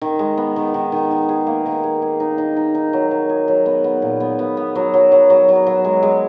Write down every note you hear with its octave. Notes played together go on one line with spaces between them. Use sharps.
D#3
G#3
B3
D#3
D#3
D#3
D#3
G#4
A#3
D#3
G#4
G#4
D#4
D#4
D#4
D#4
F#3
F#3
G#4
F#3
B3
B3
A#2
B3
B3
B3
F#3
F#3
F#3
F#3
F#3
F#3
G#3
G#3